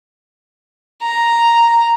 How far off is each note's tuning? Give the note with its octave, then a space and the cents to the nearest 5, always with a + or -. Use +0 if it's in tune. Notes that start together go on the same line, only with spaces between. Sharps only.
A#5 +0